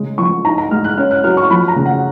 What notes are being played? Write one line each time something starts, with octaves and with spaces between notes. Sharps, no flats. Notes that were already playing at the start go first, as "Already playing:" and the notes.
Already playing: C#3 G#3
F3 C#6
D#4 A#5
A#5
G#3 F6
F#6
C#4 F6
F#6
F#3 F6
C#6
F3 B5
A#5
C#3
F#5